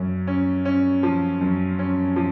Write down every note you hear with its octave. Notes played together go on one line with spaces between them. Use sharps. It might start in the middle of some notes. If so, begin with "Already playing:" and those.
Already playing: F#2 C#4
C#4
C#4
F3
F#2
C#4
F3